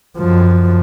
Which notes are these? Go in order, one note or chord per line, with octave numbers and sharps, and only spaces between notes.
F#2 F3